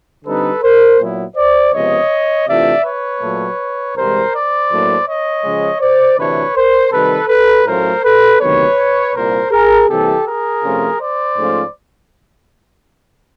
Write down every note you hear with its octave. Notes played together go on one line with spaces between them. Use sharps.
D3 G3 C4 D#4 A4 B4
A#4 C5
A#2 F#3 B3 E4
C5 D5
C#2 C3 F3 G#3 B3 C#5 D#5
C3 E3 A3 D4 F4 D5 E5
B4 C#5
A#2 F#3 A3
C2 C3 E3 G#3 A#4 C5
C5 D5
A2 F#3 A#3 D4
C#5 D#5
C#3 F3 G#3
C5 D5
D2 C3 E3 A3 D4 B4 C#5
A#4 C5
C3 D#3 G3 A4 B4
A4 B4
A2 F#3 A3 C#4 F4 A#4 C5
A4 B4
D2 C3 D#3 F#3 B3 B4 C#5
C2 A#2 G3 A#3 A#4 C5
G#4 A#4
C3 E3 G3 A#3 G4 A4
G#4 A#4
C3 F3 A3 C#4 F4
C5 D5
G#2 F3 A3 C#4 F4